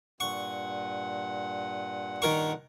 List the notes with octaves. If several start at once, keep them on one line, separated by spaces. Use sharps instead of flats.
G2 A#2 F#5 C#6
D#3 A#4 C#6